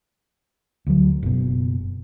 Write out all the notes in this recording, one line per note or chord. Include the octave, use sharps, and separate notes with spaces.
D2 F#3
F#1 B2